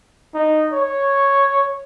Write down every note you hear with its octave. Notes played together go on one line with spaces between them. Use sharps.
D#4
C#5